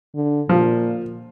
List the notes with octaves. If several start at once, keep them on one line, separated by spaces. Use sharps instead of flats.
D3
A#2 F3